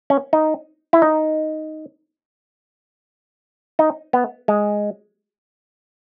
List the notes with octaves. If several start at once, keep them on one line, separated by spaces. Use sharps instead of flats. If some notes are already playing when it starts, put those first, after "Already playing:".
C#4
D#4
E4
D#4
D#4
B3
G#3